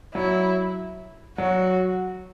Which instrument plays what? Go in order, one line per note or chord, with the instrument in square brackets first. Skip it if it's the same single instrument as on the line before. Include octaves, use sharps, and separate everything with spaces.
[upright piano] F#3 [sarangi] E4
[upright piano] F#3 [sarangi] F#4